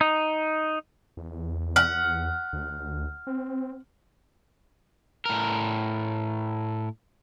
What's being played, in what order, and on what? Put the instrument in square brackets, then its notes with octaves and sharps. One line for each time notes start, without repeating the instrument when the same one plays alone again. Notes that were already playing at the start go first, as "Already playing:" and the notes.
[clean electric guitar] D#4
[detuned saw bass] E2
[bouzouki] F#5 [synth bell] F6
[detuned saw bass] D2
C4
[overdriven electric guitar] A2 A#4